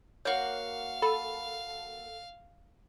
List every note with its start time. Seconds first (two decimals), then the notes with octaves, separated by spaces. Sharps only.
0.25 A#3 F#4 C#5 F5
1.02 A4 A5 B5